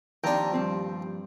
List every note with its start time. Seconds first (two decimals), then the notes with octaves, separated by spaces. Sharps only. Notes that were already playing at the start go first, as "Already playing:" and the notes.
0.24 D#2 F3 C4 D4 G5 A#5
0.52 G2 F3 C4 G4